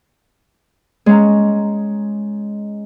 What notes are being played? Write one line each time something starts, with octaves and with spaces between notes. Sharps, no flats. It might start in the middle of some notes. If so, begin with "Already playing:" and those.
G#3 C#4 A#5